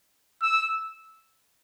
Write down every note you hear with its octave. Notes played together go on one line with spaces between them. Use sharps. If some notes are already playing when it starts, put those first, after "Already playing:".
E6